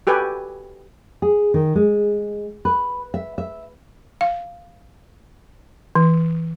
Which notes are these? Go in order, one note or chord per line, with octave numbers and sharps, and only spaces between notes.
F#4 G4 A4 B4 G#5
G#4
D#3
G#3
B4
E5
E5
F5
E3